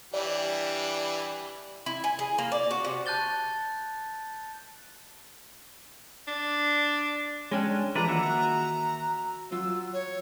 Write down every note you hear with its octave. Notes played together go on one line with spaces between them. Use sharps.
E3 G3 D4 D5
E4
G#5
G#4
A#3
D5
F#4
C3
A5 F#6 G6 A6 G7
D4
G#3 C#4 D4 C#5 G5 G#5
E3 F3 D4 G#4 B4 D5 A#5
D#3 A#3 F#4 E5 F#5
F#3 F4 E6
C#5